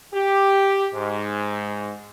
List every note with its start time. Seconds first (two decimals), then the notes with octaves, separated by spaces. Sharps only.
0.14 G4
0.94 G#2